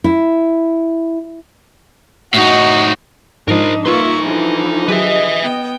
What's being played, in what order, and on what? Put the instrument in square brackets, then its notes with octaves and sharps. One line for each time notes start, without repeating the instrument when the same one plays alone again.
[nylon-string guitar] E4
[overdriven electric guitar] A2 D#4 [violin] F#4
[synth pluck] G#2 F3 [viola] D4 D#4 [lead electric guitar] A#4 C5
[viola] A#3 C#6 [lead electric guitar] D#4 C6 [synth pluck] F4 B4 [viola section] E5
[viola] D3 F3 [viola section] E3
[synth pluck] F#3 G4 G#4 [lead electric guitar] B4 E5 [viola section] D#5
[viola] B3 G5